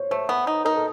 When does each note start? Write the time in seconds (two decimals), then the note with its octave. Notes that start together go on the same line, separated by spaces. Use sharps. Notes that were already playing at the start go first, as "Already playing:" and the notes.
Already playing: C5 C#5
0.11 A3 C5
0.29 B3 B4
0.47 D#4
0.65 D#4 A#4
0.76 A4